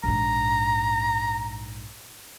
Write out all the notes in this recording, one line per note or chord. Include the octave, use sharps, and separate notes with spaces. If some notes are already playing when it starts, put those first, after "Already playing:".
A#1 G#2 A#5